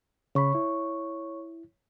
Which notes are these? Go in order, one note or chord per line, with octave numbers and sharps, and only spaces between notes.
C#3 C#5 B5 C#6
E4